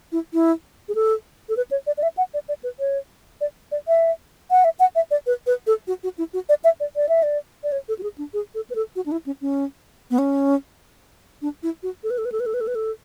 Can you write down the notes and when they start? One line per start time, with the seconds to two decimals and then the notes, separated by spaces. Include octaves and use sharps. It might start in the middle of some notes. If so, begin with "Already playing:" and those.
0.12 E4
0.33 E4
0.89 G#4
0.95 A4
1.49 A4
1.57 B4
1.71 C#5
1.87 D5
1.97 D5
2.03 E5
2.17 F#5
2.34 D5
2.48 D5
2.63 B4
2.79 C#5
3.41 D5
3.72 D5
3.88 E5
4.51 F#5
4.64 E5
4.79 F#5
4.95 E5
5.11 D5
5.27 B4
5.47 B4
5.67 A4
5.87 F#4
6.03 F#4
6.18 E4
6.34 F#4
6.49 D5
6.64 E5
6.80 D5
6.96 D5
7.09 E5
7.23 D5
7.64 D5
7.72 C#5
7.88 A4
7.99 F#4
8.03 G#4
8.18 D4
8.34 G#4
8.55 A4
8.70 B4
8.75 A4
8.96 F#4
9.06 D4
9.12 E4
9.26 C#4
9.41 C#4
10.11 B3
10.18 C#4
11.42 D4
11.63 E4
11.83 F#4
12.04 A4
12.10 B4
12.18 A4
12.25 B4
12.32 A4
12.40 B4
12.46 A4
12.54 B4
12.61 A4
12.67 B4
12.75 A4